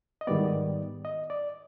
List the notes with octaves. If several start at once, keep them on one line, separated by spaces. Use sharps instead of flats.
D#5
G#2 D#3 G3 B3 D5
D#5
D5